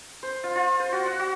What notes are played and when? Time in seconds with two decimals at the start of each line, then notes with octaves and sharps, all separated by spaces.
0.23 C5
0.44 F4
0.56 F4
0.80 C5
0.92 F#4
1.06 F#5
1.19 F#4